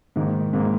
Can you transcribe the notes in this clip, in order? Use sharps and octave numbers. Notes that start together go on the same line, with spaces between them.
G#2 D#3 A#3
G#2 D#3 A#3